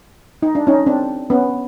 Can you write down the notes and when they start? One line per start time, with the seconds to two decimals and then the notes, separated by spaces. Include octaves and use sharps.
0.43 D#4
0.55 D4
0.67 C#4 D#4
0.86 C4 D4
1.30 B3 C#4